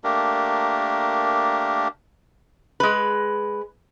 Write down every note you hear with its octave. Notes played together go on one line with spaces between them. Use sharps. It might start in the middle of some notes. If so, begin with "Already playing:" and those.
A3 A#3 D4 G4 A#4
G#3 B4